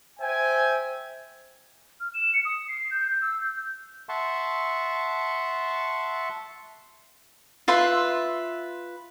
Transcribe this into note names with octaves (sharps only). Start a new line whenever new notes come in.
C5 E5 G5 G#5
F6
E7
C#7
D#6
C7
G6
G6
E6
G6
E5 F#5 A5 C6 C#6
F4 B4 E5 C6